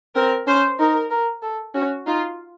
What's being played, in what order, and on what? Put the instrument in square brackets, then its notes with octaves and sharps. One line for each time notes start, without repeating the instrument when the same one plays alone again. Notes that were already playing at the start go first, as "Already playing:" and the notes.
[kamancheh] C4 [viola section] A#4
[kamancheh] C#4 [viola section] C5
[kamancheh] D#4 [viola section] A#4
[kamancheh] A#4
A4
[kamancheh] C#4 [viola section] F#4
[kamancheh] D#4 [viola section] F4